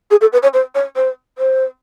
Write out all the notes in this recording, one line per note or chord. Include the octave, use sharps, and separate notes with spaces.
G#4
A4
B4
C#5
C5
C#5
C5
C5